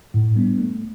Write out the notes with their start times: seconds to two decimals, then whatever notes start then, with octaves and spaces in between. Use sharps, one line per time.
0.14 A2
0.36 G3 B3 D4
0.58 A3